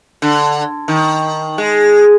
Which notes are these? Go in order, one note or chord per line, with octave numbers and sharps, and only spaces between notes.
D3
D#3
G#3